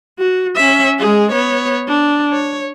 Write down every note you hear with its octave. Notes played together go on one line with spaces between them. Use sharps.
F#4
C#4 E5
G#3 G#4
B3 C#5
D4
C#5